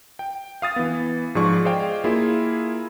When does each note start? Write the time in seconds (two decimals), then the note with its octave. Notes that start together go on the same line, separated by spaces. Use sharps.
0.19 G5
0.62 F5 D#6 A6
0.76 E3 B3
1.35 G#2 F3 F4 G#4 D5 C#6
1.65 G#4 C5 D5 D#5 F5 G5
2.04 A#3 E4 F4 G#4